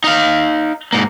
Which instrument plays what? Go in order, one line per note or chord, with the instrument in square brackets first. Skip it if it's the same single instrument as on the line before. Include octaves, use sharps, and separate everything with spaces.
[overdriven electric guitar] D#4 F5
G#2 A#3